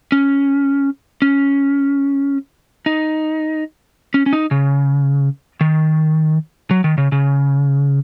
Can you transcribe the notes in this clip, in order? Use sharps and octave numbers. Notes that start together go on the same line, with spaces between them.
C#4
C#4
D#4
C#4
C#4
D#4
C#3
D#3
F#3
D#3
C#3
C#3